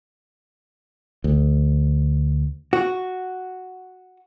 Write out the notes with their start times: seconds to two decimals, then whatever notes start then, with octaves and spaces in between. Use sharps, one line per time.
1.24 D2
2.73 F#4